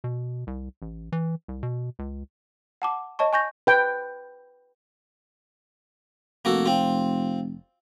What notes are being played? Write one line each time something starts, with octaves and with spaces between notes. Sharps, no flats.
B2
C2
A1
E3
C2
B2
C#2
F#5 A5 D6
C#5 D#5 A5 C#6
G#5 C#6 G6 A#6
B4 G5
F1 A#3 F#4 A4
C4 F4